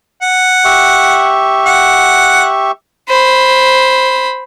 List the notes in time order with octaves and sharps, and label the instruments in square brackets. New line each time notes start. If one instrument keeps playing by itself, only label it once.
[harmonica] F#5
[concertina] G4 E5 C#6
[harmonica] F#5
[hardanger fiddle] C5 B5